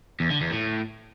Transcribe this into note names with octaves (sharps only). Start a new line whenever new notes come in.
E2
D3
E2
A2